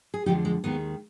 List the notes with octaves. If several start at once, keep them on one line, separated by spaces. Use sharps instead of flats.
G#4
F2 D3 F3 G#3 D#4 G4
G#3
D#2 D#3 G#3 B3